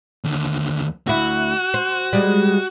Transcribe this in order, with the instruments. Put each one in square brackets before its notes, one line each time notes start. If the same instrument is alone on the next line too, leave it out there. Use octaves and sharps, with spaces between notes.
[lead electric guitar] D#2 D3
[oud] D2 E4 [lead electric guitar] F#4
[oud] C5
G3 G#3